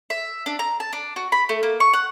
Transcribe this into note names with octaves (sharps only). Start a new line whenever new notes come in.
E5
D4
A#5
A5
D4
F#4
B5
A3
A#3
C#6
F#5